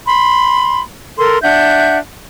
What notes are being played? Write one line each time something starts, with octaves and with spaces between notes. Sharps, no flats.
B5 C6
A4 A#4 C6
D4 E5 F#5 G6